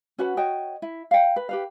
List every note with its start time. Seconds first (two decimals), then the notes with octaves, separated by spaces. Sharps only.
0.18 C#4 F#4 B4 F#5
0.37 F#4 C#5 D#5 G5
0.82 E4
1.11 F5 G5
1.36 B4
1.49 G4 B4 F5